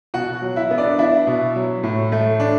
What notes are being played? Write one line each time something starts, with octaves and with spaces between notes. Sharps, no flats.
B2 F#4 F#5
F#3
E4 E5
B3
D4 D5
D4 E4 E5
B2
F#3
A2
A3
D4